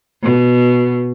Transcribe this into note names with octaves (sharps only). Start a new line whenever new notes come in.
B2